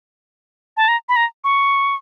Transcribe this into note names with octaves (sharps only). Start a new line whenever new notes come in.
A5
A#5
B5
A#5
C#6